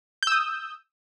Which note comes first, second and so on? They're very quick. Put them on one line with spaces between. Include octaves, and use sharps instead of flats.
G6 E6 D#6